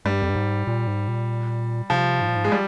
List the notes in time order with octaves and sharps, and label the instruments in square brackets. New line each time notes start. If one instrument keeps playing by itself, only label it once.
[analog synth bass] G2 [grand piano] G3
[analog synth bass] F2
G2
G#2
A#2
G#2
A#2
[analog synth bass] C3 [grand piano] F3
[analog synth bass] G#2
A#2
G#2
[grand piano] G#3
G3